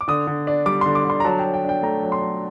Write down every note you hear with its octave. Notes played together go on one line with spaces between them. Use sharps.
D6
D3 D#6
D3
D4
G3 D6
D3 C6
D6
D3 C6
A#5
F#3 A5
G5
F#3
G5
D4 G5
A3 A#5
F#3
C6
F#3